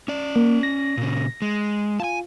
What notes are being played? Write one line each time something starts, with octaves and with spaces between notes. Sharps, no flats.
C#4 D5
A#3
A#6
A#2 C#3
G#3
F4 G#5 A5